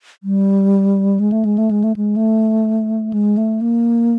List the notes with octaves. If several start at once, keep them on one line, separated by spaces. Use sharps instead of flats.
G3
G#3
A3
G#3
A3
G#3
A3
G#3
A3
G#3
A3
A#3